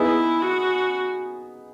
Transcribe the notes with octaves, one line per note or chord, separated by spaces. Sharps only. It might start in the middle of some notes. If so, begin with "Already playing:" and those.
Already playing: B3 D#4 E4 G#4
F#4